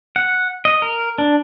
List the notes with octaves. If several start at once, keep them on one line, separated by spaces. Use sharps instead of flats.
F#5
D#5
A#4
D4